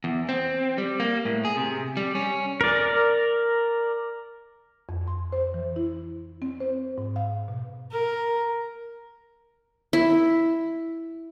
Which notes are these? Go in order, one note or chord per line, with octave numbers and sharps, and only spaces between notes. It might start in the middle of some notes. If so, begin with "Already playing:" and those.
E2
C4
G3
A#3
A2
G#4
C3
G3
C#4
A#4 D5
F2
C6
C5
E3
E4
C4
C5
G#2
F5
B2
A#4
E4